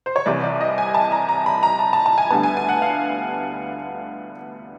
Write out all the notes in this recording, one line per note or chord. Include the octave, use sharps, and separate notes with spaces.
C5
C#5
C2 C3 E3 D5
D5
D#5
G#5
A5
A#5
A#5
B5
A#5
A5
A5
A5
G#5
D2 D3 G3 B3 A5
G#5
G#5
F#5
F5